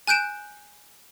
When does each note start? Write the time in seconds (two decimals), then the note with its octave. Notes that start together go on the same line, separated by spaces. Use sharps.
0.07 G#5 F#6 G6 D7 E7